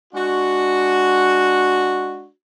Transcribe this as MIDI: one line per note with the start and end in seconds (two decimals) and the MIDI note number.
0.14 2.28 56
0.14 2.28 62
0.14 2.28 66